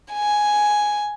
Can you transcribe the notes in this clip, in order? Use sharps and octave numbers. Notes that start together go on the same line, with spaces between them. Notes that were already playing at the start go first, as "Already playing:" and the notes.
G#5